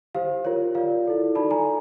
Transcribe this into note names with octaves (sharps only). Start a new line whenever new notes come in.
G4 C5 F5
F4 A#4 C#5
F4 A#4 D5 F5
E4 A4 D5
D#4 F#4 A4 D5 A5 B5
G#5 A#5